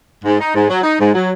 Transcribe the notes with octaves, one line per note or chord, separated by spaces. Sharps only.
G#2
D#4
G#2
F#3
D#4
G#2
F#3